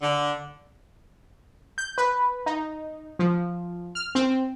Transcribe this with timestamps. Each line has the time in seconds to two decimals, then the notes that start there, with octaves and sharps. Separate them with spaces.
0.02 D3
1.78 G6
1.98 B4
2.46 D#4
3.19 F3
3.95 F6
4.15 C4